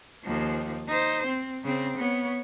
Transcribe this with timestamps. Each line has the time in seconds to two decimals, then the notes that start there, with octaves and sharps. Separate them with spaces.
0.24 D#2 F3
0.88 D#4 C5
1.26 C4
1.64 C#3 C4
1.97 B3 C#5